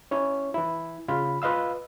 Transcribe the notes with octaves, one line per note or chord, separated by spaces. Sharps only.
C#4 E4 C#5
E3 E4
C#3 F4 B5
F4 B4 D#5 F5 E6